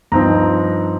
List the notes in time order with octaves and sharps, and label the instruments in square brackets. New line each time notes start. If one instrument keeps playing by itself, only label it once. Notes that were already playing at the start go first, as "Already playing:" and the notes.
[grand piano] G2 F3 C4 D#4 A#5